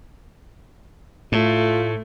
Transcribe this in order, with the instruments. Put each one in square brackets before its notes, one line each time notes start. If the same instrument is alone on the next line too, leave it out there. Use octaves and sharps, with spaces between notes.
[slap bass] A2 [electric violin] A3 [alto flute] F4